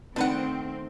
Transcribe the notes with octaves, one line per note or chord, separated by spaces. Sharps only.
D#3 A3 C4 D4 B4 C5 F#5